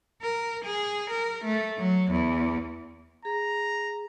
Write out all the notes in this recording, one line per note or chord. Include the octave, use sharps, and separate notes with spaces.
A#4
G#4
A#4
A3
F#3
E2
G#4 A#5